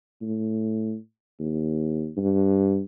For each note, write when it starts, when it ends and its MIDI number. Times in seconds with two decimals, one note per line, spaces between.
0.22 0.96 45
1.40 2.09 39
2.17 2.81 43